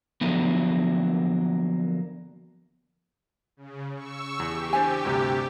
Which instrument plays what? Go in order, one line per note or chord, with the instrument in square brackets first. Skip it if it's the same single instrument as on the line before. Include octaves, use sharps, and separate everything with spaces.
[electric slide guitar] D3 F3 F#3 A#3 B3
[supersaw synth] C#3
C#6 E6
[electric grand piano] E2 [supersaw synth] G4
[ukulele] D4 C5 G#5
[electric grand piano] D2 G2 C3